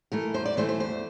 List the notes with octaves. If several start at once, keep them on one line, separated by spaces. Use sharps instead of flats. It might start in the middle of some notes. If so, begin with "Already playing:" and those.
E3 A3 A#4
E2 C5
D5
E3 A3 C5
C5
E2 C5